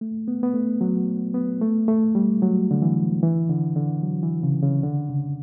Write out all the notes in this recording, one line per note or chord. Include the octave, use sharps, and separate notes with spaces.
A3
B3
B3
A3
F#3
B3
A3
A3
G3
F#3
D3
E3
E3
D3
D3
F#3
E3
C#3
C#3
D3
C#3